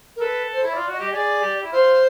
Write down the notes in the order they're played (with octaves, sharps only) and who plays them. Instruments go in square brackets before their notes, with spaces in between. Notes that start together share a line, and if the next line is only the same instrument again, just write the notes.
[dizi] A#4
[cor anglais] A4 [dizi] B4
[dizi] C5
[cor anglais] E4 [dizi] C#5
[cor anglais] F4 [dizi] D5
[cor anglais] F#4 [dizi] D#5
[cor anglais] G4
[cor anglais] G#4 [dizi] D5
[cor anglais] G4
E4
[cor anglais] F4 [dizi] C5